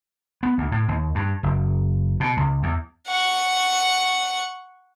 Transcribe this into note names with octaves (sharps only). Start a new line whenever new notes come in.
B3
D2
A2
D#2
G2
F#1
B2
C#2
E2
F#5 C#6